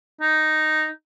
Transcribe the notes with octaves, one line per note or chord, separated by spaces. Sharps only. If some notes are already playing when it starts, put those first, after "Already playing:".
D#4